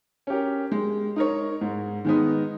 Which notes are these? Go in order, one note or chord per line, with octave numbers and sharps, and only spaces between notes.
C#4 G4 A#4
G#3
D#4 A#4 C#5
G#2
D#3 G#3 B3 D#4